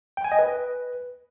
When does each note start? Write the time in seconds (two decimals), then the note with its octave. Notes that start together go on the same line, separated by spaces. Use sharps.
0.17 G5
0.24 G#5
0.32 D#5
0.39 B4